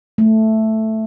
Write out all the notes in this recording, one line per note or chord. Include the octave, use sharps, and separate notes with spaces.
A3